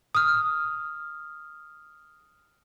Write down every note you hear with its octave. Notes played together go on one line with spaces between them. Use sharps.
D#6 F6